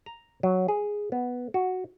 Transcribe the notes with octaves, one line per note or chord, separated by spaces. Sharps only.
A#5
F#3
G#4
B3
F#4